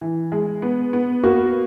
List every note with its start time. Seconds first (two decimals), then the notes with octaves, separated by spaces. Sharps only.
0.01 E3
0.32 G#3
0.62 B3
0.93 B3
1.23 A#3 F#4